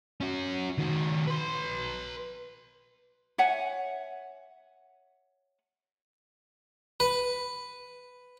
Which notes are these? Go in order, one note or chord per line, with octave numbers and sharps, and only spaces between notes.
C#4 F#4
D#3 F#4
B4 C6
C#5 E5 F#5 G#5
B4